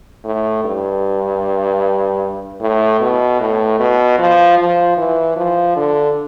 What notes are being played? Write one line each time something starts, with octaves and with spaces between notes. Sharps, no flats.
A2
G2
A2
B2
A2
B2
F3
F3
E3
F3
D3